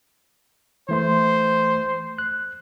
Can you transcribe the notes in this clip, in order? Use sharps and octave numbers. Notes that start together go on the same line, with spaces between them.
E3 A3 C5 C6
F#6